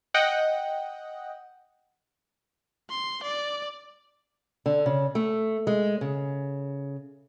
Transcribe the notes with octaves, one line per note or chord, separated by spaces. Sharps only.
D#5 F#5 G5
C6
D5
D3
C#3
A3
G#3
C#3